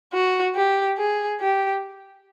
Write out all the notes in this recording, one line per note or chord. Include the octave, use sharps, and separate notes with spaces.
F#4
G4
G#4
G4